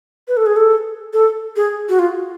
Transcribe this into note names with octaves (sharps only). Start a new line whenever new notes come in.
B4
A4
G#4
A4
A4
G#4
F#4
F4